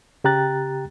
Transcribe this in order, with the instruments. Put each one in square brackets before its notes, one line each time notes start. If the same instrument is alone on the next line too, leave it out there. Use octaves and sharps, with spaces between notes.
[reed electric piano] C#3 G4 G5 A#5 F#6 A6